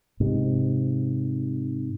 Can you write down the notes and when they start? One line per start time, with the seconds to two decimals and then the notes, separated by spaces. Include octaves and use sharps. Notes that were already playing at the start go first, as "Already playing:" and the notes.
0.20 G#2 C3